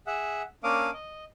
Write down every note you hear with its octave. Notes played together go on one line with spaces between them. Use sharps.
G#4 E5 F#5
A#3 C#4 D4 F5 D6 D#6
D#5